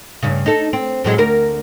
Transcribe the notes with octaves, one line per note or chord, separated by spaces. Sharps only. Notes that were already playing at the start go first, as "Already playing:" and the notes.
G2 C#3
D#4 A4
C4
A2 F#3 G#3
D2 A#4